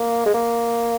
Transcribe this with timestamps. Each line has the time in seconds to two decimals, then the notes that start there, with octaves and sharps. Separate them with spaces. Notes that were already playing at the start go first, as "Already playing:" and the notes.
Already playing: A#3
0.26 G#3
0.34 A#3